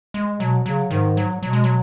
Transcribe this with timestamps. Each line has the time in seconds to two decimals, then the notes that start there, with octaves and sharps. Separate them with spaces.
0.14 G#3
0.40 B2 F#3
0.66 C#3 F#3
0.91 G#2 D#3
1.17 F#3
1.42 B2 F#3
1.53 G#3
1.64 F#3